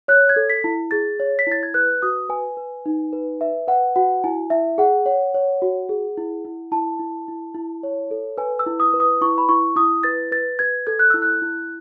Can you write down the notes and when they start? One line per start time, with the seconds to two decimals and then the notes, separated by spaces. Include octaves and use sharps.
0.08 C#5 F#6
0.29 G#6
0.36 A4
0.50 B6
0.64 E4
0.91 G#4 A6
1.20 C#5
1.39 B6
1.47 E4 A6
1.63 G#6
1.74 B4 F#6
2.02 F#4 D#6
2.29 B4 G#5
2.57 B4
2.86 D#4
3.13 B4
3.41 B4 E5
3.68 B4 F#5
3.96 F#4 F#5
4.24 E4 G#5
4.50 E4 E5
4.78 G#4 F#5
5.06 C#5 F#5
5.34 C#5
5.62 F#4
5.89 G#4
6.17 E4
6.45 E4
6.72 E4 A5
6.99 E4
7.28 E4
7.55 E4
7.83 C#5
8.11 A4
8.38 B4 G#5
8.59 E6
8.66 E4
8.80 D#6
8.94 B4
9.00 D#6
9.21 E4 C#6
9.38 B5
9.49 E4 C#6
9.76 E4 D#6
10.03 B4 A6
10.32 B4 A6
10.59 B4 G#6
10.87 A4 G#6
10.99 F#6
11.10 E4 E6
11.22 F#6
11.42 E4